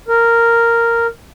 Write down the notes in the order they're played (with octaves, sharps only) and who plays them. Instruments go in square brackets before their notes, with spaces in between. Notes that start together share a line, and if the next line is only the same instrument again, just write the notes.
[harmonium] A#4